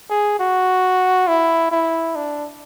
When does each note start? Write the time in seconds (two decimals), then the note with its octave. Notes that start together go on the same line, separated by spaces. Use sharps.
0.10 G#4
0.39 F#4
1.28 E4
1.72 E4
2.16 D4